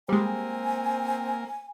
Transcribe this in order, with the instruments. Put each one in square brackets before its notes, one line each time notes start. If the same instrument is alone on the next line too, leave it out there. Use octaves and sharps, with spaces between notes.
[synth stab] G3 G#3 [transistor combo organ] A#3 [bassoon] C4 [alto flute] G#5